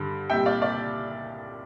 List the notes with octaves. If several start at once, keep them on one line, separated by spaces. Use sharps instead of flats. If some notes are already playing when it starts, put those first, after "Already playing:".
Already playing: G2 D3
C2 A#2 G3 E5 G5
D5 F5
D5 F5